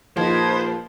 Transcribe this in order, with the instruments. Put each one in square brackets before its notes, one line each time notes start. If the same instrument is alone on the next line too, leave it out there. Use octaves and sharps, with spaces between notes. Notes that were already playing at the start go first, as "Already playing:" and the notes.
[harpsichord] A#1 [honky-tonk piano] F3 [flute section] D#4 B4 G#6 [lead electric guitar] C5